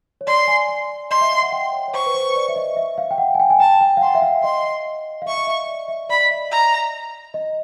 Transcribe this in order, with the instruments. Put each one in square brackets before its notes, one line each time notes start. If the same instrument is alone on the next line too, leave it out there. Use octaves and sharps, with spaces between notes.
[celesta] C#5
[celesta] D5 [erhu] C6
[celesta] G#5
G#5
[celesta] D#5 [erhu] C6
[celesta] E5
F5
F#5
G5
C#5
C#5
[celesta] C5 [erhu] C#6
[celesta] B4
C5
C#5
D5
E5
D#5
E5
F5
G5
F#5
G#5
G5
G#5
[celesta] G5 [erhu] A5
[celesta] G5
F5
[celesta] F#5 [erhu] C6
[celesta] E5
F5
[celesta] D#5 [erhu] C6
[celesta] F5
[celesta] E5 [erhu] C#6
[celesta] D#5
E5
D5
E5
[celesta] D5 [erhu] B5
[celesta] D#5
E5
[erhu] A#5
[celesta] D#5